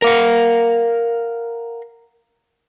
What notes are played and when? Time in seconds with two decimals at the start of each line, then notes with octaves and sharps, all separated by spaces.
0.02 A#4 F5 F#5